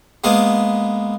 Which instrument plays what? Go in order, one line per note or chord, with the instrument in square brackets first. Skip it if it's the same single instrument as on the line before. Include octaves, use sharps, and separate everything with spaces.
[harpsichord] G#3 A#3 B3